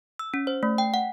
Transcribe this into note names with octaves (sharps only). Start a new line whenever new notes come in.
E6
C#4
C5
A3
G5
F#5